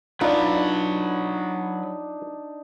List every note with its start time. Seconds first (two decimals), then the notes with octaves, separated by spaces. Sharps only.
0.21 F#3 D4 D#4 F4 B4 D5